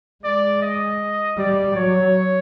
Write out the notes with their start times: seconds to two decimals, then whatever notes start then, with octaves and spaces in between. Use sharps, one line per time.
0.24 G#3 D5
0.62 D#5
1.38 G3 D5
1.76 F#3 C#5